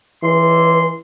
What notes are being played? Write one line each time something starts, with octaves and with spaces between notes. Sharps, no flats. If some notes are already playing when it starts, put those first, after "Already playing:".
C#2 E3 C6